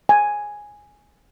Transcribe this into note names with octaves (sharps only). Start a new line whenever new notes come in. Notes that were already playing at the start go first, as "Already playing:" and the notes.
G#5